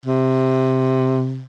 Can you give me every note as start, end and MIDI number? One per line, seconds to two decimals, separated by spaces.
0.06 1.45 48